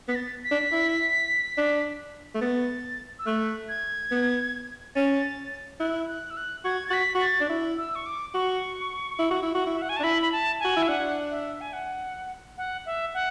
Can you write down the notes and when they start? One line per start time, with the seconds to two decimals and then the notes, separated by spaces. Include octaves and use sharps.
0.08 B3 B6
0.15 A6
0.44 B6
0.51 D4
0.72 E4
1.57 D4
2.35 A3
2.41 B3 A6
3.19 E6
3.26 A3 F#6
3.69 G#6
4.11 B3
4.95 C#4 A6
5.80 E4 F#6
6.08 F#6
6.31 E6
6.37 F#6
6.65 F#4 G#6
6.88 F#4 A6 B6
7.15 F#4
7.21 A6
7.40 D4
7.49 E4
7.78 E6
7.95 C#6
8.06 D6
8.34 F#4 C#6
9.19 E4
9.31 F#4
9.42 E4
9.55 F#4
9.66 E4
9.74 E5
9.82 F#5
9.89 G#5
9.97 A5
10.00 D4
10.03 E4 B5
10.22 B5
10.32 A5
10.60 F#4 G#5
10.76 E4
10.82 E5
10.88 D4 F#5
11.31 E5
11.61 G#5
11.73 F#5
12.58 F#5
12.86 E5
13.14 F#5